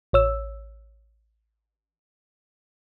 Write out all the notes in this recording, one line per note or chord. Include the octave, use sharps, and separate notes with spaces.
A1 C#5 E6